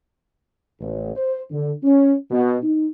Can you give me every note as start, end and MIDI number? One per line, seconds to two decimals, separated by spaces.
0.80 1.12 33
1.15 1.41 72
1.50 1.71 50
1.83 2.12 61
2.31 2.58 47
2.63 2.87 63